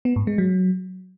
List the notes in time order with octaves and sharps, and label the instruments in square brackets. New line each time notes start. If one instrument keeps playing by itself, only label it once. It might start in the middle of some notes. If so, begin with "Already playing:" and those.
[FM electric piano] B3
G#2
G#3
F#3